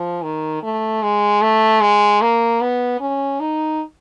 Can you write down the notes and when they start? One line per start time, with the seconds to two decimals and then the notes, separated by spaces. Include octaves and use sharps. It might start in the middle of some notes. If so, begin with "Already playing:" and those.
Already playing: F3
0.23 D#3
0.63 A3
1.03 G#3
1.42 A3
1.81 G#3
2.21 A#3
2.61 B3
3.00 C#4
3.40 D#4